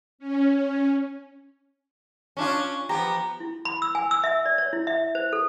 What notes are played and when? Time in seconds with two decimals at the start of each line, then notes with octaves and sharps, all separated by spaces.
0.19 C#4
2.37 C#4 D4 F4
2.89 F3 B3 G4 A#5
3.40 E4
3.65 B5
3.82 E6
3.95 G#5
4.11 E6
4.24 E5
4.46 D5
4.58 C#5
4.73 E4
4.87 E5
5.15 C5
5.33 A4